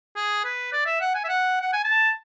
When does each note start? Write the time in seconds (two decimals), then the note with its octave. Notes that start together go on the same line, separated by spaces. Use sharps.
0.16 G#4
0.44 B4
0.72 D5
0.86 E5
1.01 F#5
1.14 G#5
1.24 E5
1.28 F#5
1.61 F#5
1.73 G#5
1.84 A5